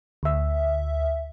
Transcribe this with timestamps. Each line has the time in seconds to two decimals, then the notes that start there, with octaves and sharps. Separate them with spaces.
0.23 D2 E5